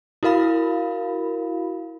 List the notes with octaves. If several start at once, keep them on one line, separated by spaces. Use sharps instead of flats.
E4 F#4 A#4 F5 B5